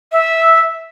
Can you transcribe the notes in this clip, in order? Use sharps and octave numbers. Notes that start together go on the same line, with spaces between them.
E5